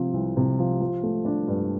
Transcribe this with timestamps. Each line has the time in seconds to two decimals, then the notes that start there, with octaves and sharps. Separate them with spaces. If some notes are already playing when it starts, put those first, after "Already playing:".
Already playing: C3 F3 C4
0.14 C2
0.37 C3
0.59 F3
0.81 F3
1.03 A3
1.25 D4
1.48 G2